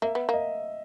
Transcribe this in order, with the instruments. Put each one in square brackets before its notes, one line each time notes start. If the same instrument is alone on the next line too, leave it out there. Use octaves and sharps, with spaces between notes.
[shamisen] A#3 [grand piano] E5
[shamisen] B3
A#3
[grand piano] D#5